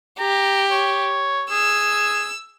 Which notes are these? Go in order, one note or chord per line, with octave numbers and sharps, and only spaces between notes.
G4 A#5
C#5
G#4 E6